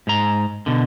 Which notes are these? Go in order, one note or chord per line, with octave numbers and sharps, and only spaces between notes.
G#2 A#5
B2 D3